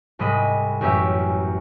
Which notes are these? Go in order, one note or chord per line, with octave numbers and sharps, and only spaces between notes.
C2 G#2 G3 G#3 D#5 B5
A1 F#2 C#4 G4 E5 B6